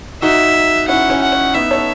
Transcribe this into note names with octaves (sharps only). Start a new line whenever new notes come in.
D#4 F#4 E5
C#4 E4 F#5
C#4
F#5
C#4
B3 D#4 E5
A4 C#5